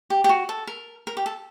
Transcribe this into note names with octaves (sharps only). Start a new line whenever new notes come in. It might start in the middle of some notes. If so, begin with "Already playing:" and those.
G4
G4
F#4
A4
A#4
A#4
G4
A4